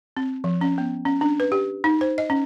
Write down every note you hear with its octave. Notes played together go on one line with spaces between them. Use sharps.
C4
F3
C#4
B3
C#4
D4
B4
G4
D#4
C5
D#5
C#4